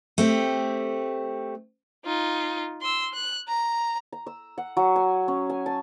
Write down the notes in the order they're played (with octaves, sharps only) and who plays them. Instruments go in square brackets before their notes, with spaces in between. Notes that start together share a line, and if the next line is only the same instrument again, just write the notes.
[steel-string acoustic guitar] A3 C4 G4
[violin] D#4 F4
C6 E6
F#6
A#5
[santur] A#5
E6
F#5
F#3
G#5
C#4
G#5
A5